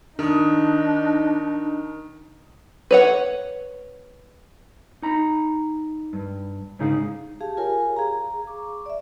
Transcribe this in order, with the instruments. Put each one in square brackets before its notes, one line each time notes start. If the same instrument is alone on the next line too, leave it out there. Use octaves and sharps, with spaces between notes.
[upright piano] D#3 D#6 [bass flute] D4 [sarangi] D#4
[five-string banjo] B4 C#5 F#5
[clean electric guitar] D#4 A#5 B5
G2
G#2 C#3 D#4 G#4 F5
[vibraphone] G4 G#4 F5 A5
F4 G4 A#4 C#5 G#5
G#4 F5 A#5
C#6 D6
D5 E5